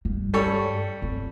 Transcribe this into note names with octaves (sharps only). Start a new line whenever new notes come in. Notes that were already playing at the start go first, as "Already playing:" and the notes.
G2
G3 A4 C#5
C4